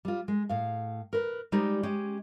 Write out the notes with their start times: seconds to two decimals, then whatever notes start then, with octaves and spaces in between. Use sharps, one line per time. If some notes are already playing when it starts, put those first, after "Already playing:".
0.05 G3 F4
0.28 G#3
0.49 A2 F5
1.13 A#4 B4
1.52 G3 G#3 D#4 G4 C5 D5
1.83 G#3 C#4 G4